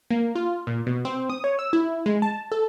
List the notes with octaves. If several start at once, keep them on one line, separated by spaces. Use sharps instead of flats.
A#3
F4
A#2
B2
C4
D#6
C#5
E6
E4
G#3
A5
A4